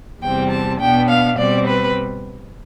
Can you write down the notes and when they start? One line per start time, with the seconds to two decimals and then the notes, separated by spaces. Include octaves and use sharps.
0.22 E2 C3 G3 C4 G5
0.51 A5
0.80 B2 B3 D4 G5
1.09 F5
1.38 B2 G3 C4 D5
1.67 B4